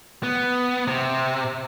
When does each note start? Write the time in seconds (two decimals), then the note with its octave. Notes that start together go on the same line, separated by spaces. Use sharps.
0.23 B3
0.88 C3